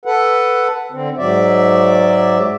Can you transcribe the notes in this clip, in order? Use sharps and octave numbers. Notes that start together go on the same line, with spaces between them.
A4 B4 F#5
D3 C4
G#2 F#3 D5 E5